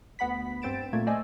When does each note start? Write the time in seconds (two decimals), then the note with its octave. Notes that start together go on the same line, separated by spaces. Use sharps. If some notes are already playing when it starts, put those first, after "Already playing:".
0.19 D2 B3 F#5 B5 B6
0.62 G2 C4 C5 A6 D7 E7
0.93 A#2 A3 A#3 G#6
1.07 A3 C5 D5 D#5 G#5 E6